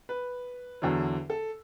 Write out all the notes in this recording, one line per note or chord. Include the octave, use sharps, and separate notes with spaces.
B4
E2 D3 F#3
A4